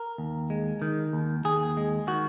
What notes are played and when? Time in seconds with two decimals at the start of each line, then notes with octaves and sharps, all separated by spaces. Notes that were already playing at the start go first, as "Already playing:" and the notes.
Already playing: A#4
0.18 D#2
0.50 G#3
0.82 D#3
1.13 D#2
1.45 D#2 G#4
1.77 G#3
2.07 D#3 F#4